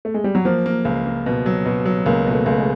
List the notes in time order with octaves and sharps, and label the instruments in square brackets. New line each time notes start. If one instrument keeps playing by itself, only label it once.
[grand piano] A3
G#3
G3
F#3
[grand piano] F3 [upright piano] A#3
[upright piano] A#3
C#2
A#3
B2
F#3
B2
F#3
[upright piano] C#2 [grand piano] A#3
[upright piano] B2
[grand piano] A3
[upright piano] C#2 [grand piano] A3
[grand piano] G#3